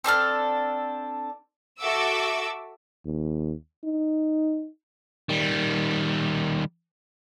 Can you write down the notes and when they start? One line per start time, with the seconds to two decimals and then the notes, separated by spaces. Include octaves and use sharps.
0.04 C4 D4 A4 F6
1.79 F#4 A4 E5 D6 E6
3.05 D#2
3.84 D#4
5.29 D#3 G3